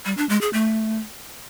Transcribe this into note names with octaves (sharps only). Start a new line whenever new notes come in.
G3
D4
G#3
G#4
A3